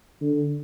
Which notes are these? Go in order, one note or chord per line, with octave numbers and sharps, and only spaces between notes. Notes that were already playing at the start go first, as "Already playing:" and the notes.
D3